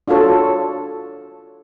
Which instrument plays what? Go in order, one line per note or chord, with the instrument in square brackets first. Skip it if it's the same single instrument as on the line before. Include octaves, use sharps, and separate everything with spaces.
[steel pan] D4 F4 F#4 A4 C#5